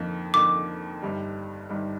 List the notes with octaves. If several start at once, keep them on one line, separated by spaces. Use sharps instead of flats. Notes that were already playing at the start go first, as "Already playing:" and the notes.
Already playing: F2 D3 F3 A#3 D#4
F2 D3 F3 A#3 D#4 D6
G1 G2 D#3 G3
G1 G2 D#3 G3